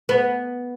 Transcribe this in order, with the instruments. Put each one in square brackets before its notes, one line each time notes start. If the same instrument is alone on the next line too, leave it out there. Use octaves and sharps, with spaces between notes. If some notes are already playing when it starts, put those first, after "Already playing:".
[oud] B3